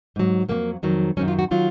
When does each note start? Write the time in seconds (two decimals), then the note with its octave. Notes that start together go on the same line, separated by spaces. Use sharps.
0.16 G#2 F#3
0.49 F2 D#3 F#3 A#3
0.83 F2 D#3 F#3
1.17 F#2 D#3 F#3 C#4
1.28 F4
1.39 F#4
1.51 D#3 F#3 F4